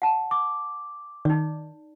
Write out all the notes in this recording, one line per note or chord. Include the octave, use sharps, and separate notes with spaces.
F#5 A5
D6
D#3 D#4 D5